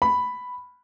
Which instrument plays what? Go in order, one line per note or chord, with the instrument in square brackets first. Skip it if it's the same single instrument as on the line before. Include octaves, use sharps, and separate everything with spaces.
[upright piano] B5